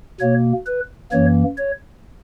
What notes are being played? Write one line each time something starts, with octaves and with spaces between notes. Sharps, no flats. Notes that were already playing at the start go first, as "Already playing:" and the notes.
B2 A#3 C#5
B4
F#2 E3 A#3 C#5
C#5